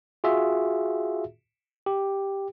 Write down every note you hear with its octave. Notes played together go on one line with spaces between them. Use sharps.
F4 F#4 G#4 E5
G4